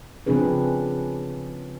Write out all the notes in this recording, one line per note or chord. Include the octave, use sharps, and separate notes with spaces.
C#3 F3 C4 D4 G#4 B4